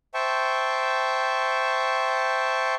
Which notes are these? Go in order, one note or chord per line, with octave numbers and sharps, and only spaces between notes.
C5 E5 G5 A5 C#6